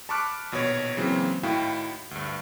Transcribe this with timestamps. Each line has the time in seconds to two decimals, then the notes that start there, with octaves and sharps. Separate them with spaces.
0.09 A5 B5 C#6 D6 F6 F#6
0.52 A#1 B2 D#3 C#5
0.97 C#3 E3 F#3 A#3 C4
1.43 A2 D#3 E4 F#4 F5 G5
2.11 D2 G2